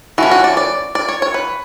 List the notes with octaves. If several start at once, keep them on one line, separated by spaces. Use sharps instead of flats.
E3 A3 C#4 F#4
F#4
D5
D5
D5
C#5
C#5
B4